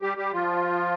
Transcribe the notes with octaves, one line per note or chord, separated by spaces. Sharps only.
G3 G4
G3 G4
F3 F4